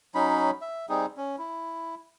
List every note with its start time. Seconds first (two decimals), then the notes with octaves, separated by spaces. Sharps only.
0.15 F#3 C#4 D#4 B5
0.62 E5
0.89 G3 C4 D#4 G#4
1.17 C#4
1.38 E4